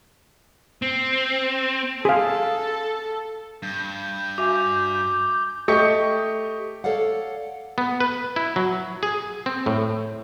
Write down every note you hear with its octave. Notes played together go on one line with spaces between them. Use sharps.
C4
G#4 A4 F5
G2 G6
F#4 E5 G#5 D6
A3 G4 D#5 C#6 G6 C#7
A4 C#5 D5 F5 F#5
B3
B4
E4
F#3
G#4
C4
A2